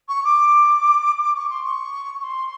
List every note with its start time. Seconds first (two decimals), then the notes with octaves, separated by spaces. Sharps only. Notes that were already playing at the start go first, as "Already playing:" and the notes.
0.09 C#6
0.24 D6
1.23 D6
1.36 C#6
1.50 C6
1.64 C#6
2.20 C#6
2.23 C6